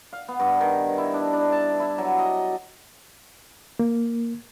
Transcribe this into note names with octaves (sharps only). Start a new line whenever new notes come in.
F5
B3
G2
D#3
E4
D4
D4
A5
E4
F#3
D#5
A#3